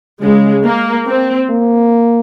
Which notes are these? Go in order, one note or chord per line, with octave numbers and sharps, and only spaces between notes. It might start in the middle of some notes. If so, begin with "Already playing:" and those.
C#3 G#3
A#3
C4
A#3